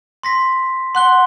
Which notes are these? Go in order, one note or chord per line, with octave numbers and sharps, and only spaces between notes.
C6 A#6 B6
F#5 C6 F#6 G7